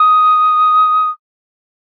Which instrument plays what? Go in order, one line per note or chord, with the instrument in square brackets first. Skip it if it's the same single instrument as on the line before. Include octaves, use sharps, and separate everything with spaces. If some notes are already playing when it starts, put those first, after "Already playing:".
Already playing: [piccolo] D#6